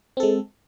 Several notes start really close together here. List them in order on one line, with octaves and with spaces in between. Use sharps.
C4 A4 G#3